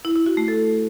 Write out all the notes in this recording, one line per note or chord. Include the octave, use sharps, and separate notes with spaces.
E4
E4
F#4
A3
A4